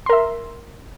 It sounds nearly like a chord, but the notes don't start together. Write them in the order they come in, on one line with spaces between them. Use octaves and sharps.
C6 A#4 E5